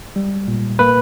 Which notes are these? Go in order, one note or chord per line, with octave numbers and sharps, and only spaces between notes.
G3
A#2
A#3 B4